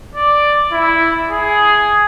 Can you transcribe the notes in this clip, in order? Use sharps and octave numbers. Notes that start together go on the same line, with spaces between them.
D5
E4
G#4